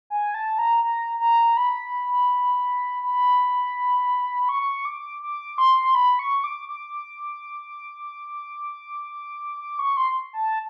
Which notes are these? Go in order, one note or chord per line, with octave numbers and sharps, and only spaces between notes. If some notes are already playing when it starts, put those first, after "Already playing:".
G#5
A5
A#5
A#5
A#5
B5
B5
C#6
D6
D6
C6
B5
C#6
D6
D6
D6
C#6
C6
A5